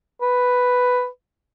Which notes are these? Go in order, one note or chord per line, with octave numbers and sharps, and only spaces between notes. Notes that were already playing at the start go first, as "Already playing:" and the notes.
B4